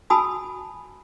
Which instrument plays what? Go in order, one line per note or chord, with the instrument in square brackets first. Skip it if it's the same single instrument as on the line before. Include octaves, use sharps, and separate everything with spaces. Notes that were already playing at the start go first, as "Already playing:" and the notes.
[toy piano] F#4 G#5 A5 B5 D#6 E6